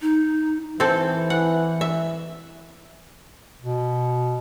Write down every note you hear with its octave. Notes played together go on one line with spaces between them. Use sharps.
D#4
E3 C4 A4
F#5
E5
B2